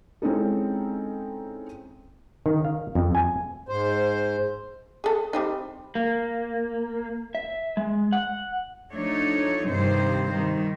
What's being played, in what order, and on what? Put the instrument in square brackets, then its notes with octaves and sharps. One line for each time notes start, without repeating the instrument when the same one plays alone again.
[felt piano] G#3 C4 C#4 D#4 E4 A4
[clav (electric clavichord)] D#3
F5
F2
G#5
[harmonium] G#2 C5
[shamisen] G#4 A4
G3 C4 D#4
[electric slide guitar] A#3
E5
G#3
F#5
[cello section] F3 A3 D4 D#4 C#5
G2 C3 D#3 C5
D#3 G3